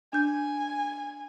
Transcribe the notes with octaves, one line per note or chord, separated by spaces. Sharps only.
D4 G#5 G6